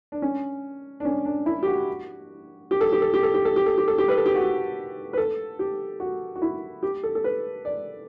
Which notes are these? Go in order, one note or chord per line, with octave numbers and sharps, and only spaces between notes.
D4
C#4
D4
C#4
D4
E4
G4
F#4
G4
A4
G4
A4
G4
A4
G4
A4
G4
A4
G4
A4
G4
B4
A4
G4
F#4
B4
A4
G4
F#4
F#4
E4
G4
A4
A4
B4
D5